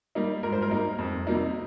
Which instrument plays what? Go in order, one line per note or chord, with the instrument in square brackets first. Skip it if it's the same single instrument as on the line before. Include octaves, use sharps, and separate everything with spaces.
[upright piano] G3 A#3 D#4
G#2 A#4
C5
A#4
G3 A#3 D#4
F2
C3 G3 A#3 D#4